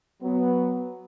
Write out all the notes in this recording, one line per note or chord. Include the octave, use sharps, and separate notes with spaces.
F#3 B3